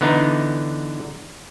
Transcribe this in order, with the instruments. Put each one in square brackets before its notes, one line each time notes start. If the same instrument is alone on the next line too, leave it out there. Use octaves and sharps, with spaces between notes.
[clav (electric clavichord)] D3 E3 B3 D4 D#4